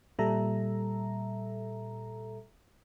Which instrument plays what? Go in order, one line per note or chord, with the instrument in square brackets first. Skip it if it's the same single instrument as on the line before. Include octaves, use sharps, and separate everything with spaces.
[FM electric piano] A#2 G3 A4 E5 A#5